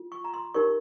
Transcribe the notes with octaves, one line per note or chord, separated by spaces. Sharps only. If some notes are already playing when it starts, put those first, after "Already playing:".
Already playing: F4
C#6
A#5
C6
D#4 G4 A#4 C#5 C#6